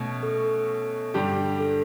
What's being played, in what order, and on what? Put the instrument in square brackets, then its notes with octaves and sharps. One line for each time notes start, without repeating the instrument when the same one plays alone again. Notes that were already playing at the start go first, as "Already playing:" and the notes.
Already playing: [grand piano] B2 A3 C#4
[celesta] A4
[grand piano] G2 D3 G3 D4 G4
[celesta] A4